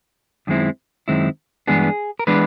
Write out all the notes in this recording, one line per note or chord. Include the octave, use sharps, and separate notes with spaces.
F#2 D#3 G#3 C4 E4
F#2 D#3 G#3 C4 E4
G2 E3 G#3 B3 D4 G#4
A#4
E3 G#3 B3 D4 B4